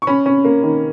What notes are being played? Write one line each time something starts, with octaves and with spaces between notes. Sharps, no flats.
C#6
C#4 B5
C#4
A#3
D#3